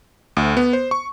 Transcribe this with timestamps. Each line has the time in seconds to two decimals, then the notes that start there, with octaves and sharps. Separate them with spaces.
0.37 D2
0.57 B3
0.73 C5
0.91 C#6